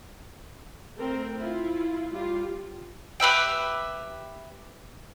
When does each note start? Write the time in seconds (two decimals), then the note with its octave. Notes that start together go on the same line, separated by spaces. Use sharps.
0.98 A3 C4 A#4 G5
1.38 E4 F4
2.11 G3 F4 G4
3.20 G4 B4 E5 G5